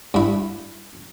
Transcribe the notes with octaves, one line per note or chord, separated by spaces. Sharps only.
G2 E4